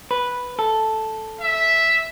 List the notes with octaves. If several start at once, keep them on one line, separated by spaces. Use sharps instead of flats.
B4
A4
E5